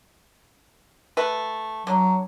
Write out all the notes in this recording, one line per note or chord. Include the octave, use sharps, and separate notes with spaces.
A3 B4
D3 F#3